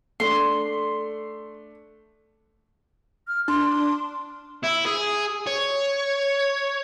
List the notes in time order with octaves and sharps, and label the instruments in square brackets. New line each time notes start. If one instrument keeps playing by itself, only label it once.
[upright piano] A3 D4 [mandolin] C6
[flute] F6
[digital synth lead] D4 [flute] C6
[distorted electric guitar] E4
G#4
C#5